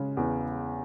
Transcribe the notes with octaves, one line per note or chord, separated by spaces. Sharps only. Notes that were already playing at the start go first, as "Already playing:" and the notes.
Already playing: C#3 G#3
E2